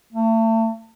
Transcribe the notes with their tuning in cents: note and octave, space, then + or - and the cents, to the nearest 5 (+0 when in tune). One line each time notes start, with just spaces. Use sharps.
A3 +35